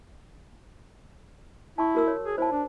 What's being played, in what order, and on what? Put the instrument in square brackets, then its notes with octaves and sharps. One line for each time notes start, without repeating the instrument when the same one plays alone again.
[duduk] E4 [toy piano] A5 C#6
[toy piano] F#4 A#4 E6
C#5
[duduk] G#4
[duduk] E4 [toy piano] C5 A5
[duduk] D4